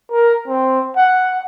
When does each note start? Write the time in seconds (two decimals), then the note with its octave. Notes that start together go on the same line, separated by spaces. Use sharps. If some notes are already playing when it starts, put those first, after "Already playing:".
0.11 A#4
0.48 C4
0.97 F#5